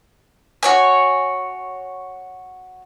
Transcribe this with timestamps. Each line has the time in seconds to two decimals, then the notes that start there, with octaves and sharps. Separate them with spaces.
0.63 F#4 C#5 G#5